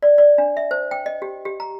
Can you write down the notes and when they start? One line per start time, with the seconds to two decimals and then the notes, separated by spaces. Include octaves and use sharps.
0.02 D5
0.18 D5
0.38 D4
0.57 E5
0.71 C5
0.91 G5
1.06 D#5
1.22 G4
1.45 G4
1.60 A#5